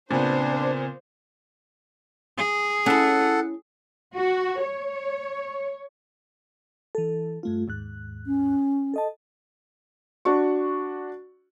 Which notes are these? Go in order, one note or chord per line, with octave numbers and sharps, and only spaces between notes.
A#2 C#3 B3 C4 D4 C5
G#4
C#4 E4 A4 F#5
F#4
C#5
E3 A4
G2 A3 F4
D#2 G#2 F#6
C#4
A4 D#5 A5
D4 F#4 C#6